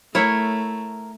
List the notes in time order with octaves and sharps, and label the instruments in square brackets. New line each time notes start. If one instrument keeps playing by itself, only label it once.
[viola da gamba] A3 [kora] E4 C#5 E5 [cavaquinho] A#4